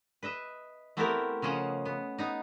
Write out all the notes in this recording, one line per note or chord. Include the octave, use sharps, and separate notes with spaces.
B4 D#5 E5
A3 B3 C4 E4 G4 A#4
C#3 F3 C#4 D#5 F#5
B3
B3 D#4